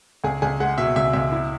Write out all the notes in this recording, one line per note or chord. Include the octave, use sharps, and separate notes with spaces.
C#2 G#4
C#2 G#4
G#3 F#5
B2 E5
C#2 E5
C#2 E5
E4